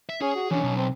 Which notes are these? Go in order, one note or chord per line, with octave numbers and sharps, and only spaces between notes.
E5
C#4 G#4
F#4
E3 C#4 D4
B1
C4